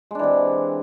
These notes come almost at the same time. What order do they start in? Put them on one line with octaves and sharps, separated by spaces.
G#3 D4 E3 C3